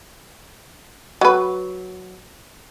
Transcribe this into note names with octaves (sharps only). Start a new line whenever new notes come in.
F#3 B4